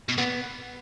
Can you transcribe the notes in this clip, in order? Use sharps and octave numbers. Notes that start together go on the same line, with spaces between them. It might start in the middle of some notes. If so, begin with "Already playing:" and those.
B2
A#2 B3